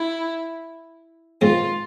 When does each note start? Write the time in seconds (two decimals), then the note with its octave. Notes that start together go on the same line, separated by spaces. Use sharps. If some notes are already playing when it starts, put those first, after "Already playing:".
Already playing: E4
1.41 G#2 D#3 G#3 C4 F4